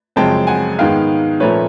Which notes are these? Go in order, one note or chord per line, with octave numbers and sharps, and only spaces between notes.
F#2 C#3 F3 G#3 C4 G5 A5
F#5 G#5
G#2 D#3 G#3 B3 F5 G5
A#2 F3 A3 C#4 B4 C#5